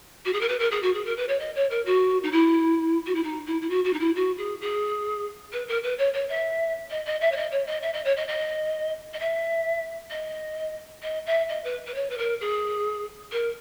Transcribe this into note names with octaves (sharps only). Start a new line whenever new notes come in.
F#4
G#4
A#4
B4
A#4
G#4
F#4
G#4
A#4
B4
C#5
D#5
C#5
A#4
F#4
D#4
E4
F#4
E4
D#4
E4
E4
F#4
F#4
D#4
E4
F#4
G#4
G#4
B4
A#4
B4
C#5
C#5
E5
D#5
D#5
E5
C#5
D#5
C#5
D#5
E5
D#5
C#5
D#5
D#5
D#5
E5
D#5
D#5
E5
D#5
B4
B4
C#5
B4
A#4
G#4
A#4